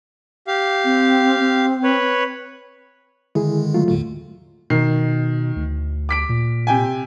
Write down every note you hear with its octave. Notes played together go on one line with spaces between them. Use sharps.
G4 F5
C4
C4
B4 C#5
D3 D#3 G#3 E4 G#4
F#3 A3 F4
D#2 A2 D3
B2 D#3 C7
D2
D6 B6 D7
A#2
C3 G5 G#5